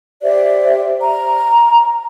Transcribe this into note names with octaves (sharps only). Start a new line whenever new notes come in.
G4 C5 D5 E5
A#5